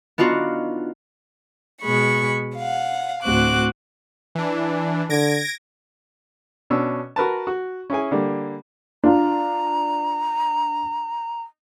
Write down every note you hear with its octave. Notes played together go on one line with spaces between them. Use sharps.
B3 D4 D#4 F4 F#4
B2 G#3 B5 C#6
F5 F#5
D2 A2 C4 F#4 D6 F#6
E3 D4
D3 G#6 A#6 D7
B2 C#4 D4 E6
F#4 A#4 B4 A5
F#4
C#4 E4 G#4 G#5
D3 G3 A#3
D4 F4 A#5